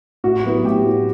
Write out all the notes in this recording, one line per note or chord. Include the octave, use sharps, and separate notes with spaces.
A2 F#4
F#3 B3 E4
A2 G4
F#3 B3 E4